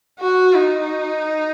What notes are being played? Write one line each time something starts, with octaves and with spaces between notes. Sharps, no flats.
F#4
D#4